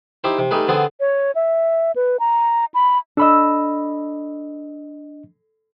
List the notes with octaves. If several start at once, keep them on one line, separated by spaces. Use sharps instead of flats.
D#4 E4 G4 C5
C3
G3 A3 D#4 G#4 B4
D3 B3 C4 G#4
C#5
E5
B4
A#5
B5
D4 A4 D#5 B5 E6